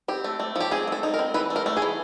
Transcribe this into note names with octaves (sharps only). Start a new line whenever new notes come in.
C4 G4
A3
A3
F3 G4
C4 G#4
A3 A4
D#4
A#4
C4
E3 B4
A3
A#4
A3
G#4
E3